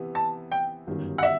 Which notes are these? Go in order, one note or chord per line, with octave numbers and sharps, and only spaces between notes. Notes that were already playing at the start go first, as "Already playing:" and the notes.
Already playing: C3 E3 B3
A5
G5
G1 F#2 D#3 G3
F#5
E5